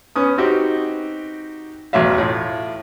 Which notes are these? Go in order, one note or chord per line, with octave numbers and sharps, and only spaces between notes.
B3 C#4 D#6
C4 D#4 F#4 G4
A1 E2 B2 E5 F5
A2 F4